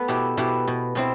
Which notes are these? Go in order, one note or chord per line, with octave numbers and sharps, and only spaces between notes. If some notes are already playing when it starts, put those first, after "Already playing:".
Already playing: A3 B3
B2 E4 G4
B2 E4 G4
B2
B2 C4 E4